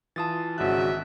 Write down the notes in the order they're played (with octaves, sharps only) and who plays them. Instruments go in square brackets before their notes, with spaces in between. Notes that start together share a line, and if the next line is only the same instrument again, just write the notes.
[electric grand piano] E3 F4 [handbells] A5 D#6 A6
[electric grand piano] G#1 F#6 [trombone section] C#3 F#4 [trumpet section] D#4 A#4 E5